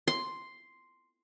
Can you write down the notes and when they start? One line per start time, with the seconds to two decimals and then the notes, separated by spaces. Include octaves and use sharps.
0.08 C6